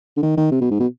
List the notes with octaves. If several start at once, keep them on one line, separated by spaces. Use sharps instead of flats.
D3
D#3
D#3
C3
B2
G#2
B2